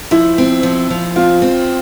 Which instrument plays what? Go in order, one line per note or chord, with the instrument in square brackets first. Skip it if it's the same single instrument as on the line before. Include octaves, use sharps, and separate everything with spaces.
[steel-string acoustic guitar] F3 [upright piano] E4
[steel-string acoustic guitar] C4
F3
F3
[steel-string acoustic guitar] C4 [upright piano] F4
[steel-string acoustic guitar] C4